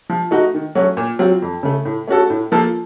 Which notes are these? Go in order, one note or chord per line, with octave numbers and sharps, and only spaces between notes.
F3
A3 D#4 F#4
D#3
F#3 A3 C#4 F#4
A#2
F#3 C4 F4
F2
C#3 A3
A2
A3 C#4 F#4 A4
A2
F3 A#3 F4 A4